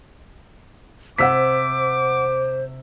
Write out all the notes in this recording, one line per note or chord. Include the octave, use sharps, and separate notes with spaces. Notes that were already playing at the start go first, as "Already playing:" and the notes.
C3 C5 F#5 D6 E6 B6